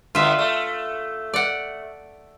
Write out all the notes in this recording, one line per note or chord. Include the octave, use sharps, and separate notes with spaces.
D3 B3 F4 E5
A3
D5 F#5